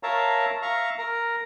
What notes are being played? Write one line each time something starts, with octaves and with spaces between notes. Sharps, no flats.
A#4 C#5 E5 F5 A5 A#5
E5 F5 A#5 C#6
A#4 A#5